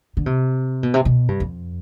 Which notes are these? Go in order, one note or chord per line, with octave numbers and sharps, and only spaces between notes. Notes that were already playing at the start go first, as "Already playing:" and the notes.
D3
C3
B2
C3
B2
G2
F2